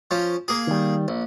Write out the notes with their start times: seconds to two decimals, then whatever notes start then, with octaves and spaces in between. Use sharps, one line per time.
0.11 F3 C#4
0.48 A#3 G#4
0.67 D#3 G3
1.08 A#1